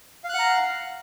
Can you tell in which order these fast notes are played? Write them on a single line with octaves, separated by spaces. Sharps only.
F5 F#6 F#5 A#5